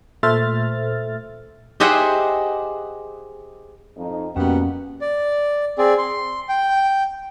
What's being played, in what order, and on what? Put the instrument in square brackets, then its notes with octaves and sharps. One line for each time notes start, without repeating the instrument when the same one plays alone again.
[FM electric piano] A#2 A3 C5 E5 F6 A6
[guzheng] G4 G#4 C5 D#5 E5 F#5
[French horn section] F2 D#4
[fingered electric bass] F2 F3 [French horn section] B2 A#3 [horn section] G3 B3 F#5 [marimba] C#4
[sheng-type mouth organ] D5
C4 G#4 D5
C6
G5